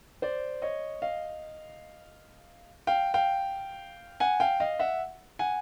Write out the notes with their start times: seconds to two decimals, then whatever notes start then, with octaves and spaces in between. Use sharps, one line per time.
0.22 C5 D5
0.62 C#5 D#5
1.02 D#5 F5
2.87 F5 G5
3.14 F5 G5
4.20 F#5 G#5
4.40 F5 G5
4.60 D#5 F5
4.79 E5 F#5
5.39 F#5 G#5